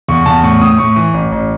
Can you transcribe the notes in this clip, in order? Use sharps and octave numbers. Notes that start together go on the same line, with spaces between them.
E2 C#6
E2 A5
A2 C#6
A2 D#6
A2 C#6
E3
A1
A1